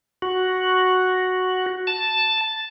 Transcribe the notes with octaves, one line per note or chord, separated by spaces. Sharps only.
F#4
A5